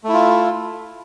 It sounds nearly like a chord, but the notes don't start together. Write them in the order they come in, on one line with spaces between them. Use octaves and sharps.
A3 E4 F4